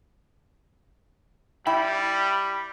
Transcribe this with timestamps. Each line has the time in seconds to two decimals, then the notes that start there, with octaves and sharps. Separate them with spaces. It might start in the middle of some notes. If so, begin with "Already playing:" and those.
1.67 G3 E4 G5 B5